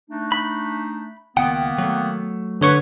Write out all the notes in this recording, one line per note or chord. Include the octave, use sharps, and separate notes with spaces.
A3 D4 D#4
B5
C#2 D#3 A#3 B3 F#5 G5
F#3 A3
D3 B4 C#5 C#6